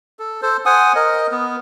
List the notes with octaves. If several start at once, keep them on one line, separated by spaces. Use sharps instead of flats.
A4
A4 C5
C5 F#5 G#5 D#6
A#4 D#5
B3